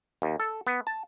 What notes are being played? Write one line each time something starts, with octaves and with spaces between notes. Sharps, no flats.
D#2
A4
B3
A5